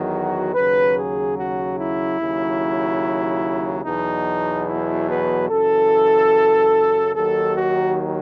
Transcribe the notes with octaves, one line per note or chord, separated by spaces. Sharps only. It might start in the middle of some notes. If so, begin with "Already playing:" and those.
Already playing: E2 D#3 F#3
F#4
D#2 C#3 F#3 B4
G#4
F#4
E4
D#2 C#3 F#3
E2 B2 F#3 D#4
E4
B4
F#2 C#3 E3 A4
D#2 D#3 F#3 A4
F#4